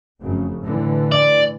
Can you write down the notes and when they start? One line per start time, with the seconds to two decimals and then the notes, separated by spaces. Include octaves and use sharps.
0.21 F1 F#2 C#3
0.60 A2 D3 E3
1.12 D5